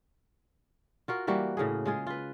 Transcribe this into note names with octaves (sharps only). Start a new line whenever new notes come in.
F4 F#4 A#4
E3 G3 A#3 F#4
A2 C#3 A#3 G#4
G#3 F4 G#4
F4 B4